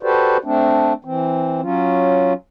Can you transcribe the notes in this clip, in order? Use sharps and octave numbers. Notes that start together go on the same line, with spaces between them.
F#4 G4 A4 B4 C5 D5
A3 C4 D4
E3 C4
F#3 C#4 F4